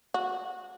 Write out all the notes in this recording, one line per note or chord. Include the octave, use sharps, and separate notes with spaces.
F#4